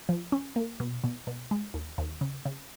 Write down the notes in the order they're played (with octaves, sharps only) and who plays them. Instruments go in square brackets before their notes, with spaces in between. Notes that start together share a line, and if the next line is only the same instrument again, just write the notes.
[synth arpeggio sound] F3
C#4
A#3
B2
B2
B2
G#3
D#2
D#2
C#3
C#3